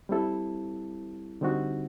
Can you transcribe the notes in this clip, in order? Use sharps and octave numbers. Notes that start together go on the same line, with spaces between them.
G3 C4 E4 A4
D3 G3 C4 D#4 F#4